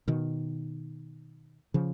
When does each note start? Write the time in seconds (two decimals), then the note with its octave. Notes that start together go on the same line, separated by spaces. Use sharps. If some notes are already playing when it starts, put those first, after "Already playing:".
0.08 B2 D#3
1.74 C#3 F3